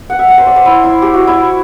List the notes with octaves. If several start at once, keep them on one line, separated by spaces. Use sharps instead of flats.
F#5
E5
F#5
C5
D5
C5
E4
E4
G4
F#4
E4